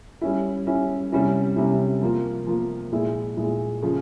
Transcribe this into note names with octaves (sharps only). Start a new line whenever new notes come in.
G3 C#4 E4
G3 C#4 E4
C3 G3 C#4 E4
C3 G3 C#4 E4
F3 A#3 F4
F3 A#3 F4
A#2 G#3 E4
A#2 G#3 E4
C#3 F3